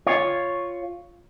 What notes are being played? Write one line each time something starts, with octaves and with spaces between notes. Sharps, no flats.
F4 C#5